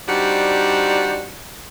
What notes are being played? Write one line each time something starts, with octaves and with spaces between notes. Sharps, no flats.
G3 C4 D4 D#4 F#4